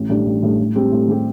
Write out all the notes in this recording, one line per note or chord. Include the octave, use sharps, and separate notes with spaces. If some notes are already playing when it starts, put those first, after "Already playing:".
Already playing: A1
A2 G3 D4
A1
A2 G3 D4
A2
G3 C4 G4
A2
G3 C4 G4